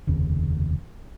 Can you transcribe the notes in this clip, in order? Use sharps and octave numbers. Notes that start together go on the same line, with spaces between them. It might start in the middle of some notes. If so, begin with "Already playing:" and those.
F1 D#2 C#3